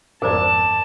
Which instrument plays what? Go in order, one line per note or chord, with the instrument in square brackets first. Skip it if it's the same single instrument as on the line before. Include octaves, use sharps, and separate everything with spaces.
[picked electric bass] G#1 F2 [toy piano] A#4 C5 D5 [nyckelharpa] A5 [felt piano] D6